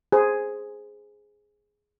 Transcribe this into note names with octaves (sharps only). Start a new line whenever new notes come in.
G#4 C5